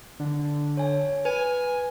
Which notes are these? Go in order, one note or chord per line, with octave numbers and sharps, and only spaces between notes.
D3
C#5 G#5
B4 G#5